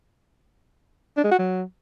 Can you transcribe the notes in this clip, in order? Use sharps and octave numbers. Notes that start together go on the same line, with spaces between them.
D4
G#3
F#4
F#3